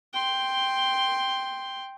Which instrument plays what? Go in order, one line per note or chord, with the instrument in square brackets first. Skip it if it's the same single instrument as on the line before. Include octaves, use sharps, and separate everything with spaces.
[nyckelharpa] G5 C6